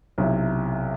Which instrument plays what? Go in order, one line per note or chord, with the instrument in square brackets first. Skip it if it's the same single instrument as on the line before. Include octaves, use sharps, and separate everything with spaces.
[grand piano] B1 C3 E4